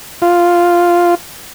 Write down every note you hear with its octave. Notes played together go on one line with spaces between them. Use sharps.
F4